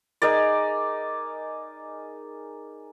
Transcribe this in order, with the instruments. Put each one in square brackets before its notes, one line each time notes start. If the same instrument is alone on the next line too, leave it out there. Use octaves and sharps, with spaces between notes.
[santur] D#4 G#4 A#4 D5